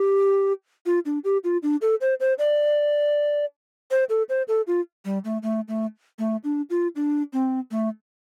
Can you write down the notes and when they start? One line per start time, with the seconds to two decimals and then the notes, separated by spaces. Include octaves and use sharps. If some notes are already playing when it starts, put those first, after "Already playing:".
Already playing: G4
0.86 F4
1.06 D4
1.24 G4
1.44 F4
1.63 D4
1.82 A4
2.01 C5
2.20 C5
2.39 D5
3.91 C5
4.09 A4
4.29 C5
4.48 A4
4.67 F4
5.05 G3
5.25 A3
5.43 A3
5.68 A3
6.19 A3
6.44 D4
6.70 F4
6.96 D4
7.33 C4
7.71 A3